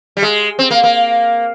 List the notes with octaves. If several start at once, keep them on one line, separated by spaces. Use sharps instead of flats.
G3
G#3
C4
A#3
A#3